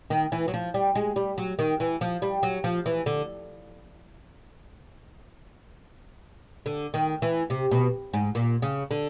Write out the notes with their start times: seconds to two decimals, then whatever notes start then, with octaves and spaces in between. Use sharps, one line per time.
0.10 D#3
0.32 E3
0.48 F#3
0.54 F3
0.74 G3
0.95 G#3
1.16 G3
1.38 F#3
1.59 D#3
1.80 E3
2.01 F3
2.22 G3
2.43 F#3
2.64 F3
2.86 E3
3.06 D3
6.66 D3
6.94 D#3
7.22 E3
7.50 C3
7.71 B2
8.13 G#2
8.35 A#2
8.62 C#3
8.91 D3